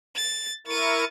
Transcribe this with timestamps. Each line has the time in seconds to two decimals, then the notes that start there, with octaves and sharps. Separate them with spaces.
0.16 A6
0.67 E4 A#4 C#6 A6 D#7